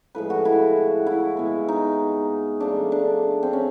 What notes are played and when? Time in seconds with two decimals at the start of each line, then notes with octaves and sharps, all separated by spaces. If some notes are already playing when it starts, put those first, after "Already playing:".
0.15 A2 F3 G#3 B4
0.30 F#4
0.45 E4
1.07 E4
1.37 B2 G#3
1.68 D#4
2.60 C#3 F3 A3 D4
2.92 D4
3.43 C4
3.53 C#4